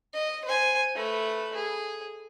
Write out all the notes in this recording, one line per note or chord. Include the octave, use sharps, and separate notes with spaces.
D#5
C5 G#5
A3 B4
G#4